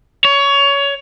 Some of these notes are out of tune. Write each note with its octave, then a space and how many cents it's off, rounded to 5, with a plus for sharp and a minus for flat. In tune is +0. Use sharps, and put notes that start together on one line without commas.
C#5 +20